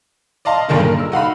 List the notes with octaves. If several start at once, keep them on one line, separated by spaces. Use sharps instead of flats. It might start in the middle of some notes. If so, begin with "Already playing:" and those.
D5 D#5 F5 A5 C6
B1 G2 A#2 D3 D#3 G#3
A#4
E6
D#4 F#4 F5 B5